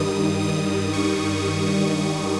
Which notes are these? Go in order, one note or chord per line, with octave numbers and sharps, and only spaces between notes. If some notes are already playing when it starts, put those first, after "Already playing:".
Already playing: G2 D#3 G3 D#6
D#6
C#6